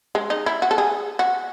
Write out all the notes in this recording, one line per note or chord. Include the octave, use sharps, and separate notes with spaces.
G#3
D#4
E4
F#4
A4
G#4
F#4